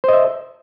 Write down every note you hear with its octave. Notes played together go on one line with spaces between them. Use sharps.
C5 D#5 E5